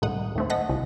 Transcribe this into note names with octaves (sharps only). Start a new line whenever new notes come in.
C2 A2 D#3 F#5 D#6
D#2 A3 C4
D#5 F#5 A5 A#6 B6
C2